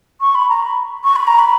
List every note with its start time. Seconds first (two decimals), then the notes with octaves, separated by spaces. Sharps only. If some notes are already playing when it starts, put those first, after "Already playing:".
0.21 C#6
0.35 B5
0.49 A#5
0.62 B5
1.03 C#6
1.15 B5
1.27 A#5
1.38 B5